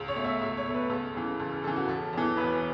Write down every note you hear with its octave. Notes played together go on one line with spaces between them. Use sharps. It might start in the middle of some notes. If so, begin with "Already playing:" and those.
Already playing: C#2
C#5
B2 A3
E5
C#2 E5
C#5
B2 A3
B4
C#2 A4
C#3 E3
C#2 A4
A4
C#3 E3 A4
F#4
E1 A4
E2 E3
E1 B4